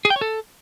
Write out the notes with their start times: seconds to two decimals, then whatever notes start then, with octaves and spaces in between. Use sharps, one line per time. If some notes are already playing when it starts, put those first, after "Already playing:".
0.05 G#4
0.10 G5
0.16 C#5
0.21 A4